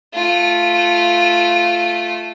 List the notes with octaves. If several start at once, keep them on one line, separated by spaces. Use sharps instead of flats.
A3 F4